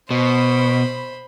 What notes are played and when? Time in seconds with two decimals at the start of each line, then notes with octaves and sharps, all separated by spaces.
0.10 B2 C5 B5